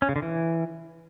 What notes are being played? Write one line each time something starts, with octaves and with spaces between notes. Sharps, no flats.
C#4
C#3
D3
E3